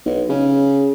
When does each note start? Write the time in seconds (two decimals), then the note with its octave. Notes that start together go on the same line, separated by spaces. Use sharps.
0.06 B1
0.30 C#3